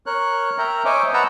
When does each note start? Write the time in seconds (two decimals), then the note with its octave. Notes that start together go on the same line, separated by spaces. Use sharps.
0.06 A#4 C#5 F#6
0.58 A#4 E5 G5 A#5
0.85 C5 C#5 D#5 E5 G#5 D6
1.14 B4 D#5 F#5 A5 A#5 E6